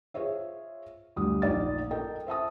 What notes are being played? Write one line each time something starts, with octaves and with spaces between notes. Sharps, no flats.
F4 G#4 C5 C#5 E5
D2 G3 D#6
A#1 D#4 D5 A6
A4 A#4 D#5 G5
C5 E5 A5 D#6